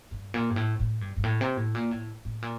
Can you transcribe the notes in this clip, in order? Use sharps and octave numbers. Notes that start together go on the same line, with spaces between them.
G2
A#2
G2
A2
A2
G2
G2
A2
C3
A2
A#2
A2
A2
A#2